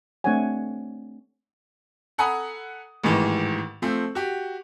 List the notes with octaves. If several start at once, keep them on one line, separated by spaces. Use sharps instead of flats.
A3 C4 D4 C#5 F#5 G#5
A4 F#5 G#5 A#5 B5 D#6
A1 G#2 D#3 E3
F3 A3 C4
F#4 G4